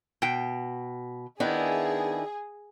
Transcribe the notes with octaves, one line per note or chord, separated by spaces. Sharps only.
B2 G5
D#3 B3 D4 E4 G#4